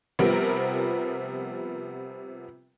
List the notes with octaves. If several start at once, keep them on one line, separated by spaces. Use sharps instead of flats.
C3 F3 G3 B3 A#4